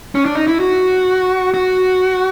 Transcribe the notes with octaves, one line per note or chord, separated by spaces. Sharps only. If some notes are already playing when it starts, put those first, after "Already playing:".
C#4
D4
D#4
E4
F#4
F#4